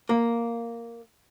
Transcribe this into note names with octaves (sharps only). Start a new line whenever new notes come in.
A#3